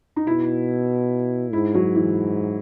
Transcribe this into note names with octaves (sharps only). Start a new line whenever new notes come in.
D#4
B2 E4
G#2 E4
F#3
E3